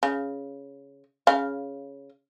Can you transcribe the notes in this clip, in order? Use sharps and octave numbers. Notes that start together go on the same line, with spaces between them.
C#3
C#3 F5